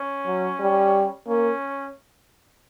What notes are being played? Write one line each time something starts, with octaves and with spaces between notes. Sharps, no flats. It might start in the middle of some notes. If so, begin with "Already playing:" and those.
Already playing: C#4
F#3
G3
A#3 C#4